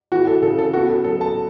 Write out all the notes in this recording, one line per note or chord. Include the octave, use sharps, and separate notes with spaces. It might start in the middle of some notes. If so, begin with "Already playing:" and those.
E3 F#4
A4
C#3 A4
A4
B3 F#4
A4
F#3 A4
A5